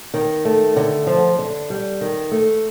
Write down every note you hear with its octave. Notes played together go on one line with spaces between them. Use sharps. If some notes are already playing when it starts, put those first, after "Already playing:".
D#3
A3
D3
F3
D3
G3
D#3
A3